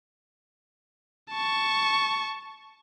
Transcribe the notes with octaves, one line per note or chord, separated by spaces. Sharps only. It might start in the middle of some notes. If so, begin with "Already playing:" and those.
A5 C#6